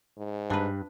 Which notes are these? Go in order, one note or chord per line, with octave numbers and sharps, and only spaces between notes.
G#2
G2 D4 B4